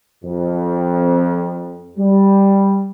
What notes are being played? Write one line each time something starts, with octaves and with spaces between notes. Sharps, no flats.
F2
G3